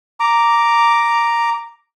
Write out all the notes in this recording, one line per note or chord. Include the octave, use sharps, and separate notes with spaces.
A#5 D6